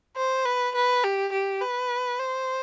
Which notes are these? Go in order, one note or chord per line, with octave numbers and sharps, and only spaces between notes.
C5
B4
B4
G4
G4
B4
C5